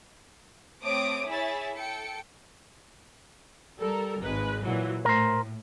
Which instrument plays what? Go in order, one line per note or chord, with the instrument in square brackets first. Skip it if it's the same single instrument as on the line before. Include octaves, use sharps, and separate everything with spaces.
[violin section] A3 C4 C#5 D6 D#6 D7
E4 G#4 C#5 E5 G#5 A6
A4 G5 C#7
[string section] G3 A4 A#4
G#1 G#3 B4
A#2 E3 F#3
[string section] A2 [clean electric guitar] A#4 C5